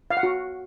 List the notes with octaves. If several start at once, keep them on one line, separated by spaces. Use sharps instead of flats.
F5
F#5
F#4